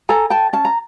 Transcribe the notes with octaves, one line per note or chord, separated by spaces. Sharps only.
A4 G#5 A#5
G5 A5
C#4 A5
A#5